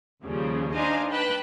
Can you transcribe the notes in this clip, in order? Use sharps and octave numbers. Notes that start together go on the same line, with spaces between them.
D#2 C#3 F3 G3
D4 D#4 C5 D#5 F5 G#5
B4 G5 A5 B5 F#6